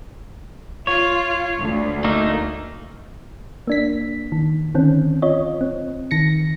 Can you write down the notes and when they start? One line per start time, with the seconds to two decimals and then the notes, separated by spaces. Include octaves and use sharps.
0.87 F4 C#5
1.59 D2
2.04 A3 A#3 D#4
3.67 A#3 D4 B6
4.32 D#3
4.74 D3 D#3 C4 C#4
5.22 F4 C#5 D#5
5.61 C4
6.11 D#3 A#6 C#7